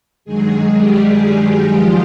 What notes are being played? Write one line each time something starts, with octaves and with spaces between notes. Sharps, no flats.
G2 D#3 F#3 G#3 G#4
G3 G4
F3 F4